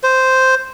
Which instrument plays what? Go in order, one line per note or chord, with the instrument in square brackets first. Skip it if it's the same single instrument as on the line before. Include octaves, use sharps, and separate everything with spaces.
[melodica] C5